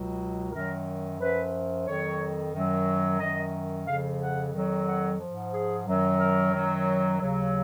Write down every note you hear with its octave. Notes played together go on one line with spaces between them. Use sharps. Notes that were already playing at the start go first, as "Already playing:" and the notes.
Already playing: C#2 B2 F#3
F#2 D#3 F#3 A#4
F#2 F3 B4
F2 D#3 F#3 C#5
F#2 D#3 F#3
F#2 D#3 F#3 D#5
F2 C#3 F3 F5
F#5
F2 D#3 F#3
F#5
G#2 F3
G#4
F#2 D#3 F#3
A#4
F#2 D#3 F#3
D#2 C#3 F#3